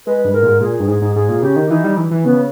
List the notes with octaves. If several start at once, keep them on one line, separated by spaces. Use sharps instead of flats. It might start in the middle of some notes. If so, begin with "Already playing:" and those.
G#3 B4
G2
G#2 A#4
A#2
G#2
A#2 G#4
G2
G#2 G#4
G#2
G#2 G#4
A#2
C#3 G4
D#3
E3 D#4
G3
E3
E3
C#3 B3